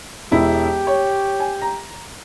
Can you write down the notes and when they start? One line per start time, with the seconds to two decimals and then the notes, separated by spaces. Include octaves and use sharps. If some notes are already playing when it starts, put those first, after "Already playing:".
0.32 E1 B2 E4 G4
0.87 C#5
1.40 G#5
1.62 A#5